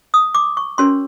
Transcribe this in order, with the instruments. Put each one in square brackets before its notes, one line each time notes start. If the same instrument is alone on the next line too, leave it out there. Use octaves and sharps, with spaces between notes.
[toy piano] D#6
D6
C#6
C#4 F#4 A#4 C#5 C6